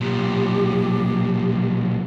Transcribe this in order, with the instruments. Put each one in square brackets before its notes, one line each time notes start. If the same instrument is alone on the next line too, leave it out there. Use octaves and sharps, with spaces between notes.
[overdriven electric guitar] B1 A#2 [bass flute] G4